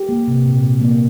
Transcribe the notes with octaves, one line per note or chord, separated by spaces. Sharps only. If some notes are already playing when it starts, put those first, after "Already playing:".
Already playing: G4
A#3
C3
A#2
A#2
A#3